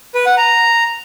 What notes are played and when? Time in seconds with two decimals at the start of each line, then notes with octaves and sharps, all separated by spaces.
0.15 B4
0.26 F#5
0.37 A#5